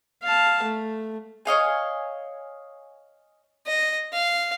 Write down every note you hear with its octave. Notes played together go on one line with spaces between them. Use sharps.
F5 A5
A3
C#5 D#5 F5 G#5
D#5
F5